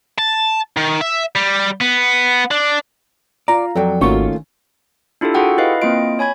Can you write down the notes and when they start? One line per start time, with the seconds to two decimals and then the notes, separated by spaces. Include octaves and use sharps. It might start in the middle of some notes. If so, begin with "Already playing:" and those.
0.18 A5
0.77 D#3
1.01 E5
1.36 G3
1.81 B3
2.51 D4
3.48 F4 D5 A#5
3.75 F2 F#3 A4 D5 G5
4.01 G#1 D#3 A3 A#3 C#4 F4 F#4 C#6
5.21 D4 E4 F4 G4 A4
5.34 F4 F#4 G#4 A4 F#5 G5
5.58 E4 B4 D#5 F5
5.82 A#3 C4 E4 F4 D#5 D7
6.19 C#5 G#5 B5 G#6